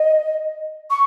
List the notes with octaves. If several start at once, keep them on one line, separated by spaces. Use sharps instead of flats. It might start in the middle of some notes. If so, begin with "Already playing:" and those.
Already playing: D#5
C#6